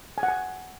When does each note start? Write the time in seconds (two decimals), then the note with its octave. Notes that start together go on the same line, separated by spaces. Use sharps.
0.18 G#5
0.23 F#5
0.28 G#5